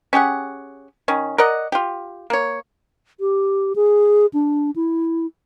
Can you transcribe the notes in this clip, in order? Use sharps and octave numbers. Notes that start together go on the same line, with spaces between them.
C#4 G4 G#4 F#5
D#3 C#4
A#4 D5 D#5 F#5
F4 G4
A#3 C#5
G4
G#4
D4
E4